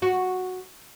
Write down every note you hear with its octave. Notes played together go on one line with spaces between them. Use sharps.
F#4